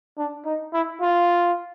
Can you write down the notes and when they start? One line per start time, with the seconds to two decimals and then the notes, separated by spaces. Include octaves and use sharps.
0.18 D4
0.45 D#4
0.73 E4
1.01 F4